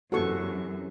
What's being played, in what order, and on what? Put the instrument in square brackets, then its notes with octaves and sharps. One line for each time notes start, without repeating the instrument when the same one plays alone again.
[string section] F#2 [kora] C3 E3 [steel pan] F#4 A4 C#6